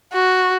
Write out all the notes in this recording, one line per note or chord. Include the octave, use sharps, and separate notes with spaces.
F#4